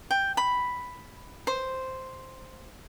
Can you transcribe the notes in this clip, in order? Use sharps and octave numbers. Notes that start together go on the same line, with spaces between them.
G5
B5
C5